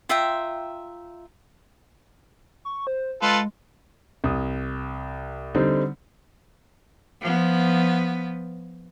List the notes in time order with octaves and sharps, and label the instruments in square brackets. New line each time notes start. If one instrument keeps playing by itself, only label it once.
[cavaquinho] F4 E5 G5 A#5
[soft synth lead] C#6
C5
[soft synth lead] G#3 [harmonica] F4 A4 B4
[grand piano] C2 D#6
D3 G3 C4 D#4
[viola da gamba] F3 B3